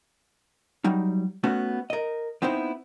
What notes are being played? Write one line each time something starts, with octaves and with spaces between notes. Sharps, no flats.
F#3 G3 D#4
A3 B3 C#4 F#4
A#4 D#5
B3 C4 D#4 E4 C5